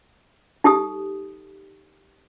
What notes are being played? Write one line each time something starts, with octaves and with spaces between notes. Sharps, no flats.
D#4 G4 A4 D#6